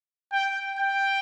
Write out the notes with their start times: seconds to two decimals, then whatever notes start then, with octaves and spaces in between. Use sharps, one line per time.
0.33 G5
0.79 G5